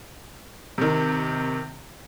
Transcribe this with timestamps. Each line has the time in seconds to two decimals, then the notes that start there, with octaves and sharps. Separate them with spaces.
0.78 C3 D#3